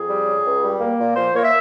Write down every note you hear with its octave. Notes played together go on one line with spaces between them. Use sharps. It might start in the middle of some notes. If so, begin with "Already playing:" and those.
Already playing: F2 G#4
G3
C#3
C#2
G3
A#3
A#2
F3 C5
A#3 C#5
E5